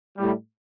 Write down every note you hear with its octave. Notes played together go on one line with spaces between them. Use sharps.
A2 G3